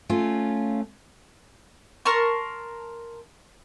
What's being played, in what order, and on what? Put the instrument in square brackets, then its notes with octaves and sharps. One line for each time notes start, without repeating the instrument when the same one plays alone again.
[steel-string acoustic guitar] A3 C#4 F4
[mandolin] A#4 A5 C6 C#6